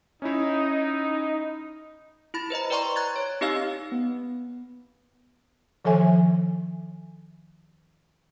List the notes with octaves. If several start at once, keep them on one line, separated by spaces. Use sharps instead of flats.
C#4 D#4 E4
E4 B5 A6
B4 C5 D#5 A#5
B4 D5 G5 A#5 C6 C#6
A#5 F#6 G#6 A6
C#5
C4 D#4 G4 D#5 F5 E6
B3
D#3 F3 A4 E5 G#5